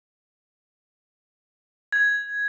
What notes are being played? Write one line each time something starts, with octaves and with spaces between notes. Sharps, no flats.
G#6